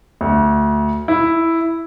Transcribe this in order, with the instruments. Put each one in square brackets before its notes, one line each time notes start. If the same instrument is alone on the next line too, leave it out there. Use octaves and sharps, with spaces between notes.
[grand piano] D2
E4